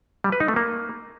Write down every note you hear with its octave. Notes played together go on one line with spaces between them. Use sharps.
G3
B4
D#4
A3
A#3